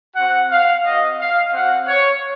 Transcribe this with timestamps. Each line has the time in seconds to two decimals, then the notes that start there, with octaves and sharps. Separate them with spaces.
0.15 C4 F#4 F#5
0.50 F5
0.85 C4 F#4 D#5
1.19 F5
1.53 C4 F#4 F#5
1.87 C#5